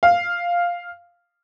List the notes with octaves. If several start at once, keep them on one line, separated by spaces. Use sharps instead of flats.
F5